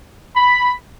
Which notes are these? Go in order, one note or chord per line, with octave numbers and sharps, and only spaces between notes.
B5